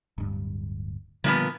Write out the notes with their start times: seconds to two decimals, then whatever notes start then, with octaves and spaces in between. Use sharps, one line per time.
0.18 D1 G2
1.24 A#2 D3 F3 G3 B3